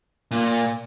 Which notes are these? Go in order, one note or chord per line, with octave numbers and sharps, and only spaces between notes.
A#2